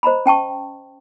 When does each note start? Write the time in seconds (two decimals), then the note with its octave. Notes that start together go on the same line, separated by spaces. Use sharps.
0.03 C5 D#5 A#5 B5
0.26 C#4 G5 A5 C#6